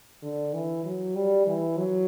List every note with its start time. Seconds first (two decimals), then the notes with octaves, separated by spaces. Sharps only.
0.22 D3
0.53 E3
0.85 F#3
1.15 G3
1.47 E3
1.77 F#3